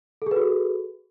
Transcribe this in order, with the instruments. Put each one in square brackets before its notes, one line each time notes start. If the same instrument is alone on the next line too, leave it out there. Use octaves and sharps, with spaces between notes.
[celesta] A4
G#4
B4
F#4